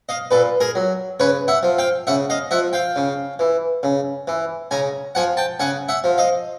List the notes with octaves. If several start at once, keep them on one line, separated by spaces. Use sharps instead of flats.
D#5 F5
A#2 A4 B4
G#4 A#4
F#3
C#3 B4 C#5
E5 F#5
F3
F5 G5
C#3 E5 F#5
D#5 F5
F3 E5 F#5
F5 G5
C#3
E3
C#3
E3
C#3 G#5 A#5
F3 F#5 G#5
G5 A5
C#3 F#5 G#5
E5 F#5
F3
D#5 F5